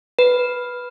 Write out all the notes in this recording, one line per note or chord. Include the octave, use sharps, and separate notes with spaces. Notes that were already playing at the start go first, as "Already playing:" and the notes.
B4